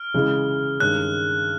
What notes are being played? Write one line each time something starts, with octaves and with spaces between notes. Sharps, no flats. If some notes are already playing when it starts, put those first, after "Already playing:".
Already playing: F6
C#3 E3 G#3
G2 D#3 G#3 C#4 F#6